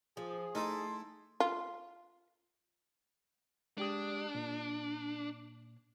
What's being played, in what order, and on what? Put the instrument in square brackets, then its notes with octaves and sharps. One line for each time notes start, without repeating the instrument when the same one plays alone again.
[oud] F3 [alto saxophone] G#4
[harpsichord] A3 E4 A4 [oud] D#4 [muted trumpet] C6
[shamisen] F4
[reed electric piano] G#3 G4 D#6 [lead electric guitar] D4
[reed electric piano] A#2